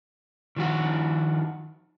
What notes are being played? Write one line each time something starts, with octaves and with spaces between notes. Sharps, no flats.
D#3 F3 F#4